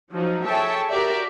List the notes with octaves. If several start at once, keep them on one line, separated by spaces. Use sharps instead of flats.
F3 F#3 D#4
G#4 A4 C#5 E5 G5 A5
F#4 G4 A#4 D5 E5